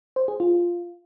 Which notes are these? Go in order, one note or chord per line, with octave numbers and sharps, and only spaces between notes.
C5
G#4
F4